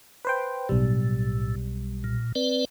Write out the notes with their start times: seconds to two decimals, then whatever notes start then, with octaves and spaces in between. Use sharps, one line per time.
0.25 B4 C5 G5
0.69 B1 A2 G3
2.04 A#2
2.35 C4 B4 D5